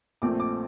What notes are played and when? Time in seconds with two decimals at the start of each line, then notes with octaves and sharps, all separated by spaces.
0.22 A#1 A#2 A3 C4 D6
0.40 D6